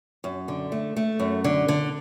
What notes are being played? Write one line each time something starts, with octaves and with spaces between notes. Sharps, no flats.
F#2
D3
A3
A3
F#2
D3
D3